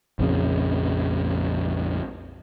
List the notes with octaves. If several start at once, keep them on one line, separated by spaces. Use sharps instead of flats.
A#1 F2 C#3